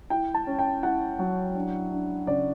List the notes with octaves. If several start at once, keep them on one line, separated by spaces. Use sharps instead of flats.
E4 G5
A5
C#4
G5
E4 F#5
F#3
D4
D4
C#3 D5